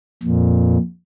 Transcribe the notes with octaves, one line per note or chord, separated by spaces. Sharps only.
F2 A#2